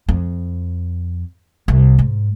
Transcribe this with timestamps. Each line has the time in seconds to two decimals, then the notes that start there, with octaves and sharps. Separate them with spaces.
0.09 F2
1.68 C2
1.99 G#2